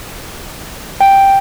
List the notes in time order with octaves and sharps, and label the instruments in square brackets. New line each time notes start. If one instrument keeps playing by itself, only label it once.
[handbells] G5